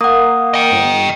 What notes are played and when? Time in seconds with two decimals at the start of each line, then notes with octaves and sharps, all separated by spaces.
0.01 A#3 F#5 D#6
0.54 D#5 G5
0.72 G1